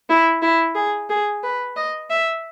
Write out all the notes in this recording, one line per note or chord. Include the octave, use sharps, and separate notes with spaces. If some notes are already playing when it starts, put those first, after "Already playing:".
E4
E4
G#4
G#4
B4
D#5
E5